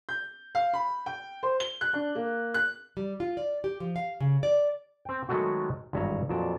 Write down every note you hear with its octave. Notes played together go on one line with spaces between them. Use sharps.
G6
F5
B5
G5
C5
G7
F#6
D4
A#3
F#6
G3
F4
D5
G4
F3
F5
C#3
D5
C4 G5
D#3 F#3 G#3 A3 B3 F#4
G#1 E2 G2 C#5 E5 A#5
F2 A#2 F#3 D5 A5